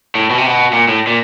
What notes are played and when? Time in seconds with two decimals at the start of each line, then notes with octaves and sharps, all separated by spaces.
0.15 A2
0.30 B2
0.38 C3
0.46 B2
0.73 A#2
0.89 A2
1.07 A#2